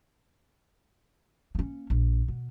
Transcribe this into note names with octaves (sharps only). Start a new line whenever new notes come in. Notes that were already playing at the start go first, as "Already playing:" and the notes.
A#3 C#4
A#1
B2